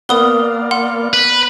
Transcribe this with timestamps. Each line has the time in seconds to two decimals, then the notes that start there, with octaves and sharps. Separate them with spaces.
0.09 A#3 B3 A#4 D5 F5 D#6 G7
0.71 F#5 C6
1.13 B4